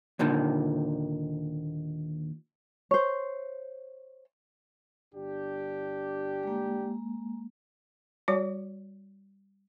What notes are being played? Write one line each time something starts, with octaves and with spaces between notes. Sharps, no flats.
D#2 A#2 D3 D#3
C5 C#5
G1 D4 G4
G#3 A#3
G3 F#4 C#5